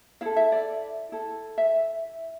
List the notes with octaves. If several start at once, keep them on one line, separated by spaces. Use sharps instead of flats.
E4 A4 F5
E5
D5
E4 A4
E5